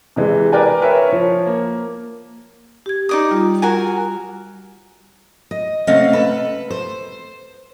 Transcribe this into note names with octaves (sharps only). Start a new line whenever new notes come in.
C3 E3 G#3
A#4 B4 D5 G5 G#5
A#4 B4 C#5 E5
F3 C#5
A#3
G4 G#6
D#4 D5 D#6
G3 F4
F#4 A#4 G#5
D#5
C3 A3 C#4 D#5 F5 F#5
A4 B4
C5